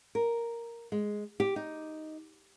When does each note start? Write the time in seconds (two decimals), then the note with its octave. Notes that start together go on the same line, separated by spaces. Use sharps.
0.15 A#4
0.92 G#3
1.40 G4
1.56 D#4